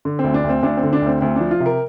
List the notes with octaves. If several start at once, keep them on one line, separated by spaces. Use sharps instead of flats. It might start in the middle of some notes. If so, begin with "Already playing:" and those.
D3
C4
D2
D4
D2 C4
D2 D4
C4
D3
D4
D2 C4
D2 C4
F3 D4
F4
C3
A#4